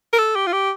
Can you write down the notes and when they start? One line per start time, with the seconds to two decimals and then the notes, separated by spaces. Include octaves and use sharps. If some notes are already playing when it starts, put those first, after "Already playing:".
0.13 A#4
0.18 A4
0.36 G4
0.47 F4
0.53 G4